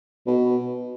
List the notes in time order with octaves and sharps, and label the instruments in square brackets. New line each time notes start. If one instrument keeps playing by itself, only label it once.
[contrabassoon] B2